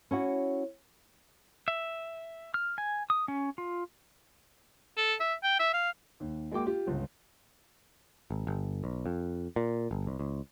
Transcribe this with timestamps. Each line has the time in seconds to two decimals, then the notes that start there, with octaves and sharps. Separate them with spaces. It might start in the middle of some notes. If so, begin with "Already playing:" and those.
0.11 C#4 E4 F#4
1.68 E5
2.54 F6
2.78 G#5
3.10 D#6
3.28 C#4
3.58 F4
4.97 A4
5.20 E5
5.43 G5
5.60 E5
5.73 F5
6.20 D#2
6.52 G#3 A#3 F#4 G5 D6
6.66 F4 G4
6.87 G1 C#2
8.31 G#1
8.47 G1
8.84 B1
9.06 F2
9.56 A#2
9.91 G1
10.07 C2
10.19 C#2